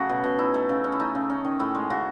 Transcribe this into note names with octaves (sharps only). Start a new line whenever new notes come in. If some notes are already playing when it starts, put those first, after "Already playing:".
Already playing: C#3 F#3 A3 F#4 G#4
B2
B2
D#4 E4
A3
C#3
C#4
E4
A3 D#4
C#3
C#4
D#3
A2 E4
G#3
C#3 F#4